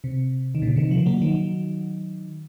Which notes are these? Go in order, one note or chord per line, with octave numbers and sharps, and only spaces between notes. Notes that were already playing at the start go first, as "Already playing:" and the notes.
C3
D#3
A#2 C#3
C3 D#3
C#3 F3
F#3 A#3
D#3 F#3